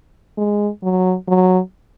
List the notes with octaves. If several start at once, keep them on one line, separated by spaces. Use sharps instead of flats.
G#3
F#3
F#3